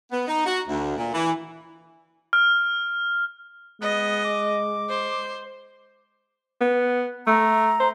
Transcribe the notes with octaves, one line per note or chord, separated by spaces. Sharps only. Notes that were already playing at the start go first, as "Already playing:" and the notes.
B3
D#4
F#4
D2
A#2
E3
F6
G#3 B3 D#5
D6
C5
B3
A3 A#5
C5